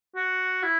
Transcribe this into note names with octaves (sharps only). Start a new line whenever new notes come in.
F#4
E4